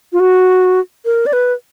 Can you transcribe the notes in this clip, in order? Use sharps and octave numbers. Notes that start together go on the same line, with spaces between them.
F4
F#4
A#4
D5
B4